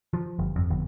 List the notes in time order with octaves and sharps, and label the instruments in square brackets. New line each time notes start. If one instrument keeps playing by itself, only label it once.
[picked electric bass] F3
G1
F2
G1